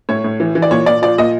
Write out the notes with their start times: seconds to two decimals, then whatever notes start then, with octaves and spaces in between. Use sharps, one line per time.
0.09 A2 C#5
0.24 A2
0.40 E3
0.55 E3
0.62 D5
0.71 A#2 C#5
0.86 A#2 D5
1.02 F3 D5
1.18 A#2 D#5